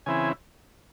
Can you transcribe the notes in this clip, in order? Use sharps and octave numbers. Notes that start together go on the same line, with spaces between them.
C#3 E3 C4 E4 G#5